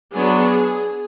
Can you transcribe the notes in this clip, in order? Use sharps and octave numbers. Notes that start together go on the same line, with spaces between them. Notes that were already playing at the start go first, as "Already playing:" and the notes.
F#3 B3 D4 G#4